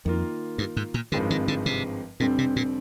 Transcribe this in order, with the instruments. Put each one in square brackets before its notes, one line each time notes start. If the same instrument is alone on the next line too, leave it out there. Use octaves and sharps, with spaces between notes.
[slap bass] F2 [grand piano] D#3 A#3 F4
[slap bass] G2
G#2
A#2
[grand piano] G#1 G2 F3 G#3 C4 [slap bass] D3
[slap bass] D#3
D3
C3
[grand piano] F1 F2 D3 G3 C4 [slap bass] A#2
[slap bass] C3
A#2